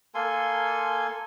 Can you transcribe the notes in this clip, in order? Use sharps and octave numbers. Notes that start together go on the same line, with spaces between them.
A#3 A4 G#5 C6